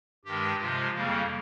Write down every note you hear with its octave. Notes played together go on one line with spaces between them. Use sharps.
G2 D#3 G#3 G4
C3 F3 G#3 F4
F2 C#3 G3 A#3